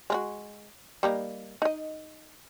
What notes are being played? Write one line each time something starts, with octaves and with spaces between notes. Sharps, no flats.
G#3 F4 F#4
G3 A#3 D#4
D#4 D#5